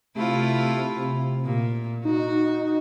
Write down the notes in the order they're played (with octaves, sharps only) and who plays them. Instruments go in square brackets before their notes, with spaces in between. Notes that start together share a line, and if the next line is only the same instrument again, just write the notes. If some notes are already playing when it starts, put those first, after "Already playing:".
[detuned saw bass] C3 [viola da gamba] A3 E4 F4
[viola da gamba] A#2
[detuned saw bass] D#4 [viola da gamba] F#4